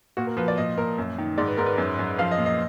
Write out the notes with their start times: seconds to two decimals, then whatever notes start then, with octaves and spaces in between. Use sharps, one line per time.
0.17 A#2 F#4
0.27 A#4
0.37 F3 B4
0.48 D5
0.58 A#2 D#5
0.77 A#2 A#4
0.98 F#2
1.18 D#3
1.38 G#2 D5
1.47 B4
1.57 G#2 A#4
1.66 B4
1.78 F#2
1.99 F#2
2.18 F3 F5
2.31 D#5
2.38 A#2
2.46 D#5